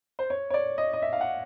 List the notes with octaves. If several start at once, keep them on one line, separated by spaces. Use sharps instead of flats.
C5
C#5
C#5
D5
D#5
D#5
E5
F5
F#5